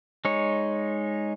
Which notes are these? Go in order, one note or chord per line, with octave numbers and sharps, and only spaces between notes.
G#3 D#4 C#5